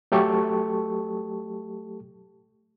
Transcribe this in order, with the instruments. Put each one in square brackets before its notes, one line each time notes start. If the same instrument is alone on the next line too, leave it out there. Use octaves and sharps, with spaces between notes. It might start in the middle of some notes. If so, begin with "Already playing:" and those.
[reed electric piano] F#3 A3 G4 A4 A5 C#6